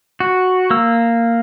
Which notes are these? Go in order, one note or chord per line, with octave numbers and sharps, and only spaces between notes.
F#4
A#3 E6